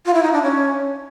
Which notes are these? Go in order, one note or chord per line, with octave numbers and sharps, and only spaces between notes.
F4
E4
D#4
D4
C#4